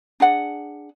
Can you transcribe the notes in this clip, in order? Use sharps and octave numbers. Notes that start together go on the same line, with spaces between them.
D4 G#4 F#5